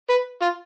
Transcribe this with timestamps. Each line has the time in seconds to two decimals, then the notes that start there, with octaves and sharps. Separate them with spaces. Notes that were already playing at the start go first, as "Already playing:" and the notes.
0.09 B4
0.42 F4